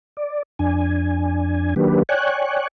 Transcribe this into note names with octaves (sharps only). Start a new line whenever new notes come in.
D5
F2 D4 G#5
D#3 F#3 A#3 D4 G4 B4
C#5 D5 G5 G#5 C#6 F#6